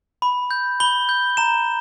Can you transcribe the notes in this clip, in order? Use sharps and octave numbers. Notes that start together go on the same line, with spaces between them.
B5
G6
B5 G7
G6
A#5 E7